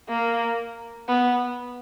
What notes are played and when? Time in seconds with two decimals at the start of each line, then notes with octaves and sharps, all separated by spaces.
0.09 A#3
1.09 B3